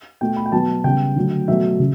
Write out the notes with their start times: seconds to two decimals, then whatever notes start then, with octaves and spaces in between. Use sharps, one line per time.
0.21 B2 A3 G5
0.37 B5
0.46 G5
0.52 B2 F#3 B3 A5
0.84 C#3 G3 B3 G5
1.16 D3 F#3 A3
1.48 B2 F#3 A3 E5
1.79 C#3